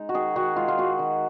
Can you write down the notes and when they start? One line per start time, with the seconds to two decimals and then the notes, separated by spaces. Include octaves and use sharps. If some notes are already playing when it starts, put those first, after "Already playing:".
Already playing: G#3 D#4
0.09 F#4
0.14 D#3 G#4
0.36 D#3 F#4
0.56 G#3 F4
0.68 F4
0.78 D#4 F#4
0.99 D#3